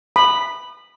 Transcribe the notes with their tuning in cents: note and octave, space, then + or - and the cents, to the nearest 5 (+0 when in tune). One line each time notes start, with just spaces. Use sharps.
B5 +0 D#6 -35